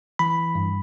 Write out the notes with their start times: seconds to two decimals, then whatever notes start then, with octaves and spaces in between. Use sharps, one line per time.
0.19 E3 B5
0.55 G2